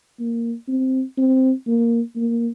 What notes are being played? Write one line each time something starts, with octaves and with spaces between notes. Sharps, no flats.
A#3
C4
C4
A#3
A#3